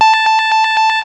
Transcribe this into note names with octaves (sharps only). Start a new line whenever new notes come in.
A5